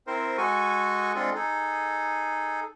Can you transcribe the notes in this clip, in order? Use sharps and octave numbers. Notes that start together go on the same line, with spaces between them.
C4 E4 A#4 C5
G#3 F#4 A4 G#5 C#6
G#3 C4 D4 F4 A4
D#4 G#4 A4